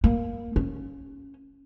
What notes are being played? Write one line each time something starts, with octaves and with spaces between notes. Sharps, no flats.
A#3
C#4